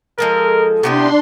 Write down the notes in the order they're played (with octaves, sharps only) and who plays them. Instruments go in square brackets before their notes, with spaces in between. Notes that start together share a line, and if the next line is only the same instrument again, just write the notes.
[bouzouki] F3 G#3 A4 [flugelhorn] A#4
[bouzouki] C3 B3 E4 [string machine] D4 C6 [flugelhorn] G4